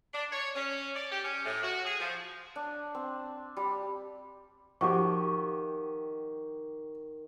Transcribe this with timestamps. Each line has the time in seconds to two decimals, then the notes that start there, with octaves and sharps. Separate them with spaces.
0.13 D4
0.32 C#5
0.55 C#4
0.95 D5
1.10 G4
1.23 C#4
1.45 A2
1.62 F#4
1.84 G#4
2.00 F3
2.56 D4
2.94 C4
3.57 G3
4.81 D#3 F3 F#4 G4 C#6 D6